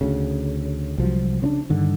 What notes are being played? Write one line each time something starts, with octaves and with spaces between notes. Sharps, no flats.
D2 C#3
C2 F3 F#3
C#3 C4 D4
G2 D3 D#3